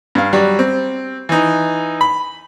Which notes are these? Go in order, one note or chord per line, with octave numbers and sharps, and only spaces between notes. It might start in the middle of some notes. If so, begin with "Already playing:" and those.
G2 F5
F#3 G3
C4
E3 D#4
B5